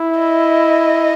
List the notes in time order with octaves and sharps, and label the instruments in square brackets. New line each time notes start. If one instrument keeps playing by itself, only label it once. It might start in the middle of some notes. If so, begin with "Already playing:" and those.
Already playing: [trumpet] E4
[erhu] D#5